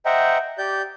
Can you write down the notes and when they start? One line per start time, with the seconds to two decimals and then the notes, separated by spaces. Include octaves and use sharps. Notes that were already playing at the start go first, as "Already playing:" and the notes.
0.06 C5 D#5 E5 F#5 G5 A#5
0.58 G4 D5 G6